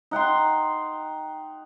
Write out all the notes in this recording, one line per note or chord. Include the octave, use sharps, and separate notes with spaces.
D#4 F#5 G5 C6